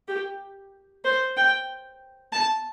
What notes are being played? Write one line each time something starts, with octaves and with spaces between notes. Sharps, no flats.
G4
C5
G5
A5